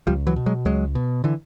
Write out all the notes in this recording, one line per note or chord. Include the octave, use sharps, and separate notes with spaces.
C#2 F3 G3
E3 F#3
B2
F#3 G#3
C#2 F#3 G#3
B2
D3 E3